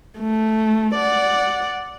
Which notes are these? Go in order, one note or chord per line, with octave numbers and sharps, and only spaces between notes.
A3
D5 F#5